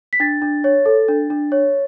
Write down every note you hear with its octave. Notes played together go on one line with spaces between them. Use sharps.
B6
D4 A6
D4
C#5
A4
D4
D4
C#5